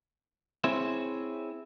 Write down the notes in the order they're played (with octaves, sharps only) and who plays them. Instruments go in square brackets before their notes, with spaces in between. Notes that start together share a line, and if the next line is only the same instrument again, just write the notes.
[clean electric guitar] C4 E4 G#4 C5 C#5 E5